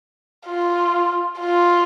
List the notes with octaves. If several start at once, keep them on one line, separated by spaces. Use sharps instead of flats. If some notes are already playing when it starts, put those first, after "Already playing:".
F4
F4